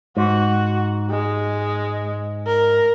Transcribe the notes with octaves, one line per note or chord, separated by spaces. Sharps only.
G#2 F#4
G#3
A#4